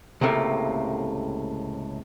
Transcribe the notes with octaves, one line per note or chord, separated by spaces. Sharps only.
C#2 A2 C3 A3 A#3